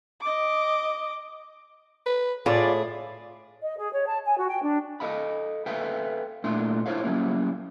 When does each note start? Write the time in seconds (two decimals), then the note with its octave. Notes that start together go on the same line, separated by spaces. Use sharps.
0.21 D#5 D6
2.06 B4
2.46 A2 F4 G#4 D5
3.62 D#5
3.77 G#4
3.94 C#5
4.06 A5
4.25 G#5
4.38 F#4
4.49 G5
4.63 D4
5.00 A4 A#4 D#5 F5 B5
5.66 A4 B4 E5 F5 G5
6.44 A#2 A3 D4 E4 C6
6.86 D4 E4 F#4 C5 C#5 F5
7.03 F#3 G3 A#3 C#4 E4